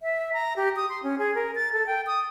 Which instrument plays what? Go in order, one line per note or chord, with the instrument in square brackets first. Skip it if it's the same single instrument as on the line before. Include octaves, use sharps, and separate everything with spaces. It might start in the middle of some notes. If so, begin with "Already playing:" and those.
[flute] E5
A#5
G4
D#6
C6
C#4
G#4
A#4
A6
A4
G5
D#6